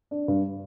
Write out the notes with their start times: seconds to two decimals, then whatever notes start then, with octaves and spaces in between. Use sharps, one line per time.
0.11 D4
0.28 G2